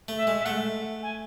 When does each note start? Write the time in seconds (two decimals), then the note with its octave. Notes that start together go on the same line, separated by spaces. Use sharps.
0.08 A3
0.17 E5
0.27 G#3
0.39 E5
0.45 A3 F#5
1.02 G#5